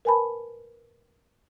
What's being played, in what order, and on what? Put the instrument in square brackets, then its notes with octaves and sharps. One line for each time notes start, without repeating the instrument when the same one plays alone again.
[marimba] A#4 B4 G#5 A5 B5